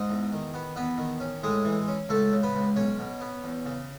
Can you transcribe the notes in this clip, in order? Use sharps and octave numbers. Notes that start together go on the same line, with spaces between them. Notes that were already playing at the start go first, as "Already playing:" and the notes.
Already playing: G#2 D#4 D#5
E2
D#3
B3
E2 B3 B4
D#3
C#4
A2 G#3 G#4
E3
C#4
C#2 A3 A4
C#3
B3 B4
C#2
B1 C#4 C#5
B2
B3
E2
C#3